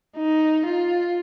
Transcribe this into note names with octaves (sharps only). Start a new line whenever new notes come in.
D#4
F4